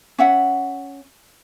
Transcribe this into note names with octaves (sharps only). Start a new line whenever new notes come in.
C#4 E5 F#5